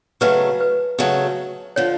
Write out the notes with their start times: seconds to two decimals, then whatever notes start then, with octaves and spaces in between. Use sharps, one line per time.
0.21 C#3 F#3 A3 B4
0.60 B4
0.99 C#3 F#3 A3
1.76 D3 F3 C#5